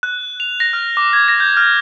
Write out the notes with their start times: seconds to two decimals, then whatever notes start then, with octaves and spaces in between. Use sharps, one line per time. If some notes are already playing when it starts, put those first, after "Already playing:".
0.03 F#6
0.40 F7
0.60 A#6
0.73 F6
0.97 D6
1.13 G#6
1.28 A#6
1.40 G6
1.57 F6